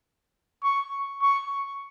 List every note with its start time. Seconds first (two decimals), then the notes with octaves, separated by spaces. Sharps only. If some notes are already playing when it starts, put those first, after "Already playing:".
0.63 C#6
1.21 C#6